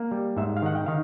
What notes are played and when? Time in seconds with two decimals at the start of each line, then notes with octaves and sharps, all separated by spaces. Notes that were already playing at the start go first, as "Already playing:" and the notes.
Already playing: A#3
0.11 G3
0.37 G#2 E5
0.57 F5
0.62 D#3 F#5
0.75 G5
0.86 D#3 F5